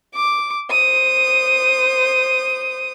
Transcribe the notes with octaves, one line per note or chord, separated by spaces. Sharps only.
D6
C5 D#6